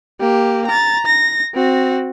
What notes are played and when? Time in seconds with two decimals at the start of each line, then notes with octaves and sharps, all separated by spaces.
0.20 A#3 G4
0.67 A#5 A6
1.06 A#6
1.54 C4 F#4